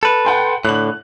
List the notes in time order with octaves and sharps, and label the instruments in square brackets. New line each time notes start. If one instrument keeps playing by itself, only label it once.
[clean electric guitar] A4 B4
[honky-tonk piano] F#5 G5 C6
[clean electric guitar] A2 D3 [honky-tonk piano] F#6 F#7